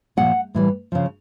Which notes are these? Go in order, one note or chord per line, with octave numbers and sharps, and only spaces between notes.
A#2 F3 F#5
A2 E3 G3
C#3 F3